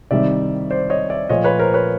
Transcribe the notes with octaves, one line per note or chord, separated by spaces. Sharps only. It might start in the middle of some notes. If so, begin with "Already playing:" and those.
C2 C3 D#3 G3 D5 E5
C5 D5
C#5 D#5
D5 E5
A#2 F3 A3 C#5 D#5
B4 C#5
A#4 C5
B4 C#5